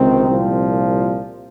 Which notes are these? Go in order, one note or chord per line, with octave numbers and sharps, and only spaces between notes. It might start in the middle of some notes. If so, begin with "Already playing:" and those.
Already playing: C#2 C3 D#3 C4
C2 A#2 F3